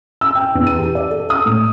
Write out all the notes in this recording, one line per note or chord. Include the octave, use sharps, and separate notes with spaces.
E6
G5
E2
D#7
G4
D5
A4
D#6
A2